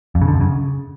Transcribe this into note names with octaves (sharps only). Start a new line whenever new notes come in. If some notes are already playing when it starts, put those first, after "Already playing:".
F2
C#3
D3
F#2
C#3